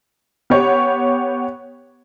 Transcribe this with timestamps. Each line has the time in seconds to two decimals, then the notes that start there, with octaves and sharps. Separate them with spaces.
0.50 B3 G4 C#5